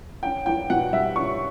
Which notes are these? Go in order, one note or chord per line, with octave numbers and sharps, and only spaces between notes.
C#4 G5
E2 G5
B2 F#5
G3 E5
C#4 C#6